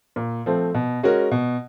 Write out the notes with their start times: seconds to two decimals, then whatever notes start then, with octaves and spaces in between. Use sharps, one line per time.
0.16 A#2
0.46 F3 A3 C4
0.74 B2
1.03 G#3 C#4 F#4 A#4
1.31 B2